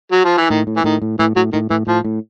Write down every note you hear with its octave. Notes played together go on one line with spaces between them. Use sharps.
F#3
F3
E3
A2 D#3
A2
E3
A2 D#3
A2
A2 E3
A2 F#3
A2 D#3
A2 E3
A2 F3
A2